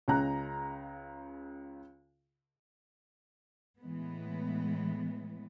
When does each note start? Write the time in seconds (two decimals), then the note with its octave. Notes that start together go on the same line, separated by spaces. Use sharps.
0.08 C#2 C#3 G#3 A#5 F#6
3.80 A2 E3 G#3 B3